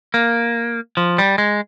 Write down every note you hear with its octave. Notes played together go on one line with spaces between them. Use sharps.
A#3
F3
G3
G#3